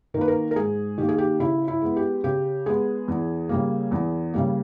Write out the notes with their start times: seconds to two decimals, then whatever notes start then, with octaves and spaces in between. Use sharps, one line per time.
0.14 D#3 A#4
0.18 A#3 B4
0.28 A#4
0.51 A#4
0.56 G#2 G#4
0.98 D#3 A#3 G4
1.09 G#4
1.18 G4
1.39 C#3 E4
1.68 E4
1.82 G#3 B3
1.96 G4
2.24 C#3 G4
2.66 G#3 B3 G#4
3.08 E2
3.49 C#3 G3 A#3
3.92 E2
4.34 C#3 G3 A#3